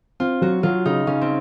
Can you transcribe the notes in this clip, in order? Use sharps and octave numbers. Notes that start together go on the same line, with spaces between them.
C4 F4
F#3 F#4
F#3 F4
C#3 D#4
C#3 C#4
C4